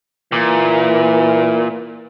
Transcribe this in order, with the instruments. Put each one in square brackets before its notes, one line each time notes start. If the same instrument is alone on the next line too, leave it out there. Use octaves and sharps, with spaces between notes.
[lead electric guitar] A#2 [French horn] E3